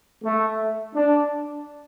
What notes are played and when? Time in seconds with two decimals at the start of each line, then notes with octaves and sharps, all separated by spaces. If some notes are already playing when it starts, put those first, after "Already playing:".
0.24 A3
0.95 D4